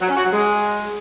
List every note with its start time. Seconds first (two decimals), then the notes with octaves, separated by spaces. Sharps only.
0.01 F#3
0.09 C#4
0.16 F#4
0.24 F#3
0.32 G#3